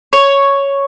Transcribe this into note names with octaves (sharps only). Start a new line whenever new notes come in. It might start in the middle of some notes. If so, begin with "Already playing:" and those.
C#5